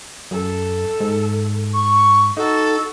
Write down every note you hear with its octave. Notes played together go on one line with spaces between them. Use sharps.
F#2 A4
G#2
C#6
D#4 F#4 A4